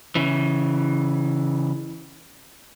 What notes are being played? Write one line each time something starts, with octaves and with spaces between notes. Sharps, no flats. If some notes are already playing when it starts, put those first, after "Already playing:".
C#3 E3